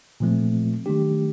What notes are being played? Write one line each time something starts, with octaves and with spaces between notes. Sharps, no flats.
A#2 F3 A3 C4
D#3 F#3 A3 D4 G4